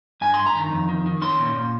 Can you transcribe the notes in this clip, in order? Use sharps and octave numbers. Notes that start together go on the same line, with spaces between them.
G2 G#5
G2 C6
A#5
D#3
F2
D#3
D#3
C#4 C6
A#2
A#2